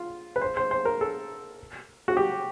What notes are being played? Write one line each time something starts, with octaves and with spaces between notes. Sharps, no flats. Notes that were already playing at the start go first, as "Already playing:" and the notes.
Already playing: F4
B4
C5
C5
C5
A#4
A4
F#4
G4